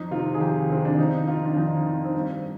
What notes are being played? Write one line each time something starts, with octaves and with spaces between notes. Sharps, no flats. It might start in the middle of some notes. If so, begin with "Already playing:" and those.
Already playing: F2 D#4
C3 D#3 F4
G#4
F2 G4
C3 D#3 C4
D4
F2 D#4
D#3 F4
D4
F2 D#4
D#3
C4
G2 D4